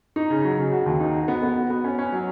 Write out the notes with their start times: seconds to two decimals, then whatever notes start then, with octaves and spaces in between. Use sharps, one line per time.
0.16 D#4
0.30 C#3
0.44 F#3
0.59 C#3
0.72 F#4
0.86 D#2
1.00 D#4
1.14 F#4
1.28 B3
1.43 B3
1.56 F#4
1.70 B3
1.84 C#4
1.98 C#4
2.12 F#3